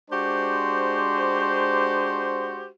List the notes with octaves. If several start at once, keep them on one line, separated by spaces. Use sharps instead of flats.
G#3 D4 F#4 G4 C5